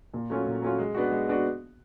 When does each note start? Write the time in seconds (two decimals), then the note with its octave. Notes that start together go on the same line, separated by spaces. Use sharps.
0.14 A#2
0.30 F#3 A3 C#4 F4
0.46 A#2
0.62 F#3 A3 C#4 F4
0.79 G#3
0.95 B3 D4 F#4
1.11 G#3
1.28 B3 D4 F#4